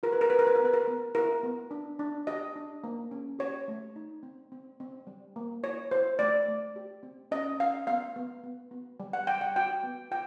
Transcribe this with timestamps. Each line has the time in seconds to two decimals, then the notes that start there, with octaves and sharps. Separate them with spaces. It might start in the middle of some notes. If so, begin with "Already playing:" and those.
0.03 F4 A#4
0.12 B4
0.21 A#4
0.30 F4 B4
0.39 A#4
0.47 B4
0.56 B3 A#4
0.65 B4
0.73 A#4
0.87 B3
1.15 E4 A#4
1.43 B3
1.71 D4
1.99 D4
2.27 G4 D#5
2.56 D4
2.84 A#3
3.11 C#4
3.39 G4 C#5
3.68 A3
3.96 D#4
4.23 C4
4.52 C4
4.80 C4
5.07 G3
5.36 A#3
5.63 E4 C#5
5.91 E4 C5
6.19 A3 D5
6.48 A3
6.76 G4
7.03 C4
7.31 C#4 D#5
7.59 C#4 F5
7.87 B3 F5
8.16 B3
8.43 B3
8.71 B3
9.00 G3
9.13 F#5
9.27 G3 G5
9.41 F#5
9.56 F#4 G5
9.84 B3
10.11 F4 G5